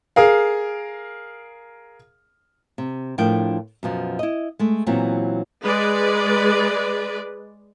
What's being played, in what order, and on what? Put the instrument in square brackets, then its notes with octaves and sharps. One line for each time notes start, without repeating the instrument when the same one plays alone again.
[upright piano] G#4 A#4 F5
[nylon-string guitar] C3
A2 F3 D4 A#4 G5
F#2 B2 F3
E4 D#5
G#3 A3
A#2 E3 F#3 B3 C4
[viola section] G#3 B4 D5